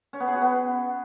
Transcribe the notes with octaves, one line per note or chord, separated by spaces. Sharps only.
C#4
B3
G#4
F#4
B3